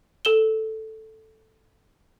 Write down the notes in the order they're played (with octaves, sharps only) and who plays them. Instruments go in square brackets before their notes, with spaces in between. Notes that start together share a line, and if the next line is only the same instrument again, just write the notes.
[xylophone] A4 E7 G7